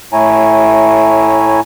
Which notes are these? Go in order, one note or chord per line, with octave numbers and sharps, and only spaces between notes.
A2 A3 E4 C#5 G#5 A#5